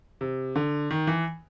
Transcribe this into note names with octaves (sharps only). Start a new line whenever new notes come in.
C3
D3
D#3
E3